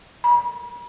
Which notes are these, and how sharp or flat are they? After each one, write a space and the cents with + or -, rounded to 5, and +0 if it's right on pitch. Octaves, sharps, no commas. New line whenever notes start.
B5 -45